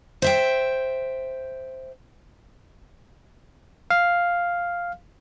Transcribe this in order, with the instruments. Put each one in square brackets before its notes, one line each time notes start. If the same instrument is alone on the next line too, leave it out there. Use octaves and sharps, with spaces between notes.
[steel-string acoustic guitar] C5 E5 G5
[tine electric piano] F5